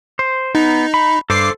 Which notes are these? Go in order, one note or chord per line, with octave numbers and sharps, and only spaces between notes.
C5
B3 D#4
B5
G2 A4 C5 D6 C7